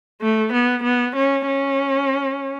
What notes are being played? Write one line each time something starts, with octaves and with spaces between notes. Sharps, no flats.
A3
B3
B3
C#4
C#4